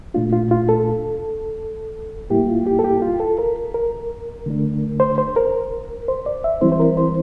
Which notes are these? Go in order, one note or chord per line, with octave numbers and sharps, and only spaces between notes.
A#2 A3 D4 F4
F4
F4
A4
A2 G3 A#3 E4 G4
F4
G4
A4
G4
F4
A4
A#4
A#4
D3 A3 D4
C5
C5
A#4
C5
D5
E5
E3 G3 C4 E4 C5
C5
A#4
C5